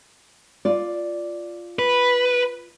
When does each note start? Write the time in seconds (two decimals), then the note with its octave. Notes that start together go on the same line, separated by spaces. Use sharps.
0.65 F4 D5
1.79 B4